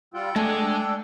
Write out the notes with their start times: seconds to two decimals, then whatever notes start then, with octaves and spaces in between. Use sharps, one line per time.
0.14 G3 F4 F#5 G5 E6
0.36 G#3 A3 D4 G#5